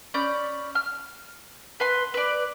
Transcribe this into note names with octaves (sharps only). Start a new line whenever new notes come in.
C#4 D5 B5 G6
F6
B4 C6
B4 D5